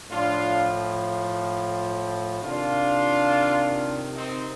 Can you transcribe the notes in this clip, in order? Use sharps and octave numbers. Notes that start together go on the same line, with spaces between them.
A2 F3 D4 F4
C3 D#3 D4 F4
C4 D#4